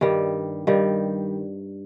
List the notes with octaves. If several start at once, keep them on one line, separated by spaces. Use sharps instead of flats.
G2 D#3 G3
G2 D#3 G3